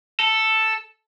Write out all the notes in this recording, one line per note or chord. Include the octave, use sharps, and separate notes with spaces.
A4